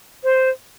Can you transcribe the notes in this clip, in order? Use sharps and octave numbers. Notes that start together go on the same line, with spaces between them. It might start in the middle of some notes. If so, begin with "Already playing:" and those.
C5